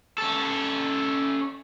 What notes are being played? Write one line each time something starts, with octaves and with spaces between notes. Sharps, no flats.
C#4 A4